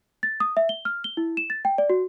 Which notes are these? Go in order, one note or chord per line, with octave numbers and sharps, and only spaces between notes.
A6
D#6
E5
G7
F6
G7
E4
E7
A6
G5
D5
F#4